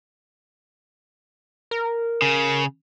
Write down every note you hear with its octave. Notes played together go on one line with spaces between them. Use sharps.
A#4
C#3